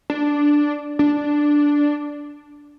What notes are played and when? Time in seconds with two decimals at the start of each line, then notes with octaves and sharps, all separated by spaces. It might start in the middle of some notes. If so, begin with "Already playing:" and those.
0.10 D4
0.99 D4